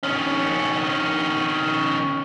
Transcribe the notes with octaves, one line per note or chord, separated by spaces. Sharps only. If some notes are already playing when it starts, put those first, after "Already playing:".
D#3 C#4